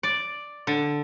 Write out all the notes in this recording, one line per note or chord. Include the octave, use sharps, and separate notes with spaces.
D5
D3